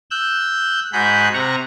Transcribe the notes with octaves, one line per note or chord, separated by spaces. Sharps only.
E6 F#6 G6
G#2 F#4 G#4 B5 F#6 G6
C3 F#5 A#5 C#6